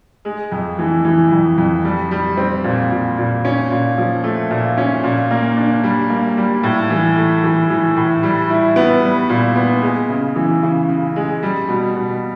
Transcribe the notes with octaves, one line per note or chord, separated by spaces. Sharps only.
G#3
F2
E3
E3
F2
F2
G3
G3
C4
A#2
A#2
A#2
C#4
A#2
F3
A3
A#2
C#4
A#2
A#3
D4
G3
A#3
G3
A2
E3
A3
E3
E3
A2
G3
E4
B3
G3
A#2
B3
G#3
C#3
E3
C#3
C#3
G#3
G3
B2
B2